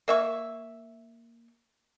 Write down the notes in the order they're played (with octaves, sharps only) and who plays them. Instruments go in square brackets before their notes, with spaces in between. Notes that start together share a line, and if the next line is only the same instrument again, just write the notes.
[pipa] A#3 E5 C#6